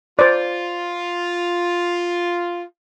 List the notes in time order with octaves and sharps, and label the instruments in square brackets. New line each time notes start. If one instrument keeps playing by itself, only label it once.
[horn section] F4 [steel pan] C5 D5